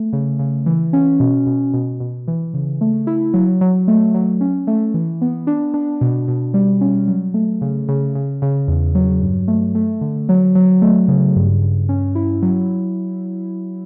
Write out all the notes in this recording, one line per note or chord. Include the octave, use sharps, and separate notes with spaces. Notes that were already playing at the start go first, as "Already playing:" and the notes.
Already playing: A3
C#3
C#3
E3
C#4
B2
B2
B2
B2
E3
C#3
A3
E4
F#3
F#3
A3
F#3
C#4
A3
E3
B3
D4
D4
B2
B2
G3
C#4
F#3
A3
C#3
C#3
C#3
C#3
E2
F#3
G2
A3
A3
D3
F#3
F#3
A3
C#3
G2
G2
C#4
E4
F#3